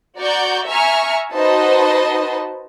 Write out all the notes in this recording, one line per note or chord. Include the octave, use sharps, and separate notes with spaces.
F#4 D5 A#5 C#6 G6
E5 G#5 A#5 C#6 F6
D#4 F#4 B4 C5 D#5 A5